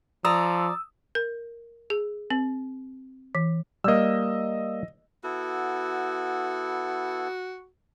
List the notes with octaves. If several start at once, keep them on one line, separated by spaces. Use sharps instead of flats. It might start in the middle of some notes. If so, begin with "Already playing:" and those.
F3 D5 A#5 D#6 E6
A#4
G#4
C4
E3
G3 A#3 D#5 E6
B3 E4 F#4 A4